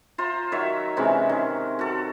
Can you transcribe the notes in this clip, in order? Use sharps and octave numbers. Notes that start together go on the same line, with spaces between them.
F4 C5 A#5
D#3 F#3 C#5 E5
C3 E3 G#3 C#4
D#3
F#4 A4